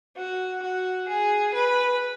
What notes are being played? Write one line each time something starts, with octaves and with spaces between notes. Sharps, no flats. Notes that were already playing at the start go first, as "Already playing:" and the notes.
F#4
F#4
G#4
B4